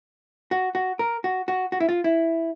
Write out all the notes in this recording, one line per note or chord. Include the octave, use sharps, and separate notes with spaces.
F#4
F#4
A#4
F#4
F#4
F#4
E4
F4
E4